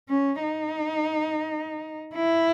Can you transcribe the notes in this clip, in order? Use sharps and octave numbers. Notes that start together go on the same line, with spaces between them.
C#4
D#4
E4